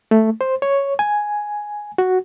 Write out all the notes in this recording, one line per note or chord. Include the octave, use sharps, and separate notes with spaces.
A3
C5
C#5
G#5
F#4